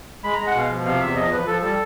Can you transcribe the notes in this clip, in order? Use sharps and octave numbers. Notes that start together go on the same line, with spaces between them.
G#3 B5
A#5
G#3
F#5
B2 F5
F3
C3 F5
E2 E5
F3 D#5
F3 B4
F3 A4
G3 A4